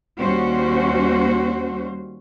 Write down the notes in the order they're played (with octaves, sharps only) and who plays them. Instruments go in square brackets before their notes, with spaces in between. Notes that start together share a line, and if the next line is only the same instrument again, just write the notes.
[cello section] D#2 G3 C#4 F#4 C5